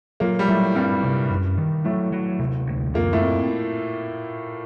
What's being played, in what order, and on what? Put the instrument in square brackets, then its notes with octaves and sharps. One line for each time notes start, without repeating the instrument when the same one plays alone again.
[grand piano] A#2 A#3 [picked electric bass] F#3
[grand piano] G3
[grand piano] A2 A3 [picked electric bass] F#3
[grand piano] G2 G3 [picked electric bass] C4
[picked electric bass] C3
F#2
D#3
[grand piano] A2 A3 [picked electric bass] F#3
[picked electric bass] F#3
C3
D2
[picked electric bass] F#2 [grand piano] A#2 A#3
[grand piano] A2 A3
[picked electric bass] C4